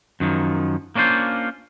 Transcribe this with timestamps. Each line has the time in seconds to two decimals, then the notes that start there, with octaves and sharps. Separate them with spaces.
0.20 F#2 D#3 F3
0.96 A#3 C#4 D4 F4 C5